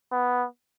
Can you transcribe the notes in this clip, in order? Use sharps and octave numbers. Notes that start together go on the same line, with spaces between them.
B3